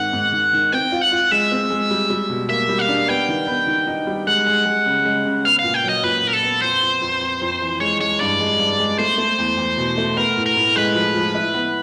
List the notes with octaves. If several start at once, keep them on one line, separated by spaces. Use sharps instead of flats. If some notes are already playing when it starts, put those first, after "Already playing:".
Already playing: G#2 D#3 C4 F#5
G#2
D#3
D#3
C4 G5
F4
F#5
F4
G#3 E5
C4
G#3
G3
G3
B2
A#3 E5
G3
F5
D4
B3 G5
D#3
B3
D#3
D#4
G3
G#3 F#5
G#3
G#3
C#3
G#3
C#3
B3 F5
A#2 F5
G5
F#3
D#5
A#2 B4
A#2 A#4
A4
B3
F2 C5
F2
F2
F2
F2
E3
G#3 C#5
G#3 C#5
G2 D5
G#3
G2
G#3
A3 C5
A3
E2
E2
B2
A3
B3 A#4
A2
A#4
A2
G#3 B4
F3
F3
E4
B3